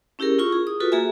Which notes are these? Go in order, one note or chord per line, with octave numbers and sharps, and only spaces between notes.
C#4 E4 G4 G#4 A#4
E4 F4 C#6
G#4
D#6
F4 F#4 A4 B4
A#3 G#4 A4 E5 G#5